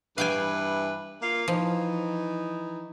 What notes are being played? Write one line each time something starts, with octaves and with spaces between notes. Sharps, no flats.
G2 E3 B4 F5 G5 G#5
A#3 F4 F5
E3 F3 D#4